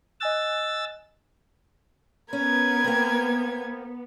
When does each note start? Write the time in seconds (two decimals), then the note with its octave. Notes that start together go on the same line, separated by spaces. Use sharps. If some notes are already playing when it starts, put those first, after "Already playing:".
0.20 D#5 G#5 E6 F#6 A6
2.33 B3 C#4 A#4 B4 G#6
2.84 A#3 C4